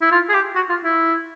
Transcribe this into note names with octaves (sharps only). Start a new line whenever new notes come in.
E4
F4
G#4
G4
F#4
F4
E4